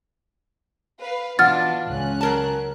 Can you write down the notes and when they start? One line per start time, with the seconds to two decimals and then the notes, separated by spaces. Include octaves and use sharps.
1.01 B4 F5
1.39 B2 E3 D4 F4 F#5 F6 A6
1.87 C#2 C#4 F#6
2.21 F#3 A#4 A5